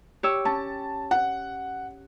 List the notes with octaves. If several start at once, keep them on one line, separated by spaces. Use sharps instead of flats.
G4 C#5 E6
C#4 A5
F#5